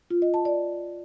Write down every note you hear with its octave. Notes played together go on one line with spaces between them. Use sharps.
F4
D#5
A5
D5